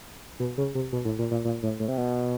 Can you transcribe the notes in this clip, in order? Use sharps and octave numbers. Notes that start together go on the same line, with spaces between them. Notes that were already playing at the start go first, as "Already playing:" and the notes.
B2
C#3
C3
B2
A2
A#2
A#2
A#2
A2
A2
C3
B2